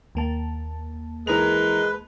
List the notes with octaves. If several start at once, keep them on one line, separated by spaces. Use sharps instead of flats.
D#2 A#3 A5
E3 G#3 A#4 B4 F7